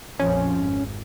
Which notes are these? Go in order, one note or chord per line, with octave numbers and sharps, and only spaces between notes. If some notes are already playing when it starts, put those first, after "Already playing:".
A#1 F2 F3 C#4
G#1